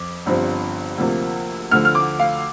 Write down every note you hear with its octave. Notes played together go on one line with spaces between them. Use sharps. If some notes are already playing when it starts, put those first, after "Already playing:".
Already playing: F2 D6
G1 G2 F3 C4
D2 C3 F3 A#3
D2 D3 F3 F6
F6
D6
F5